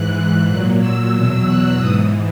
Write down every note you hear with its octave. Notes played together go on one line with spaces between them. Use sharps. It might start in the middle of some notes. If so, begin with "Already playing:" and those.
Already playing: G#2 E3 F#6
F#6
A#2 F#3 F#6
E6
E2 B2 F#3 E6
F#6
G#2 E3 D#6